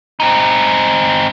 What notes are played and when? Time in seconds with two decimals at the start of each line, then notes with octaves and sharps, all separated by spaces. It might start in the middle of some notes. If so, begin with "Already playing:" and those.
0.20 C4 D#4